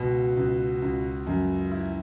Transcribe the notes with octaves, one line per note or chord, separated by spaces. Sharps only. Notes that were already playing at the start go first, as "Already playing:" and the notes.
Already playing: C#2 B2 F#4
C#2
C#2
F#2
E4